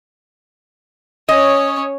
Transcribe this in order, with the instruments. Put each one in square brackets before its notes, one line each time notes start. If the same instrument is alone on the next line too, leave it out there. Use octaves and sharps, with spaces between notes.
[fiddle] C#4 C#5 [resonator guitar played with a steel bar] D#5